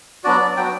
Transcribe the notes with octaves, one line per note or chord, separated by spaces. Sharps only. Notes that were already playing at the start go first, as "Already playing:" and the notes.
F#3 B3 D4 F#4 D5
F#3 B3 D4 F#4 G5